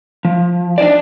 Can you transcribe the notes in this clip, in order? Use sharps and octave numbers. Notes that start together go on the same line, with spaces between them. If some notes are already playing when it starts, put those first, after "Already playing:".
F3
D4 D#4 C5 D5